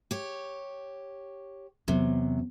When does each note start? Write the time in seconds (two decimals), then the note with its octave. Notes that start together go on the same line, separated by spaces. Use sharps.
0.11 G4 C#5
1.88 E2 C3 F#3